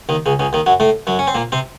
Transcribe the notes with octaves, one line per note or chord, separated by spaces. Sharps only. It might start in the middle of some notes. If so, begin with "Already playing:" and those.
D#2 D#3
C#2 C#3
C#2 C#3
D#2 D#3
F#2 F#3
A2 A3
F#2 F#3
C#4
C4
A#2 A#3
C3 C4